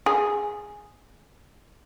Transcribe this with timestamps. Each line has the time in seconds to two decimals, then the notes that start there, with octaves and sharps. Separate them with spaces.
0.06 G#4